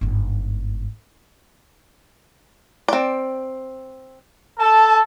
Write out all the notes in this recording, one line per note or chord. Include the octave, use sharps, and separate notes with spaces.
G1 G#2
C4 D5
A4 A5